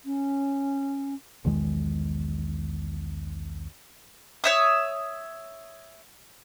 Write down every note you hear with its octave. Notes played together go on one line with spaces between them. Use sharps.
C#4
B1 E2 D#3 G#3
C#5 E5 D#6